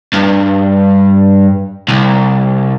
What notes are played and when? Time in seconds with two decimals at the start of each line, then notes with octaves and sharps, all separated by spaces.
0.14 G2
1.88 C2